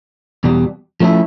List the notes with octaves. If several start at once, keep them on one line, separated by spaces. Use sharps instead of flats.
E2 B2 G3
F3 A3 C#4 E4 A4